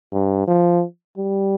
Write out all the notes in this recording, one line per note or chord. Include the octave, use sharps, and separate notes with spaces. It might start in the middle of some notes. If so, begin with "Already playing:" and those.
G2
F3
G3